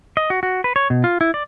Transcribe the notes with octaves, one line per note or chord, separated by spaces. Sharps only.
D#5
F#4
F#4
B4
C#5
B2
F4
E4
D5